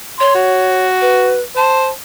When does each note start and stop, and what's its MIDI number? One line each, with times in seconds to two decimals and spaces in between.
0.20 0.86 73
0.20 0.33 84
0.35 1.37 66
1.01 1.41 71
1.57 1.89 72
1.57 1.89 81